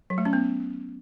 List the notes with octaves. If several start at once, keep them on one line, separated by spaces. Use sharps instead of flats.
F#3
A3
C#4
B3